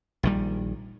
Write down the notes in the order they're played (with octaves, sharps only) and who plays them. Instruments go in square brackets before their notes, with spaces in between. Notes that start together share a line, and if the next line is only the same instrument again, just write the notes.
[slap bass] A#1 D#3 G3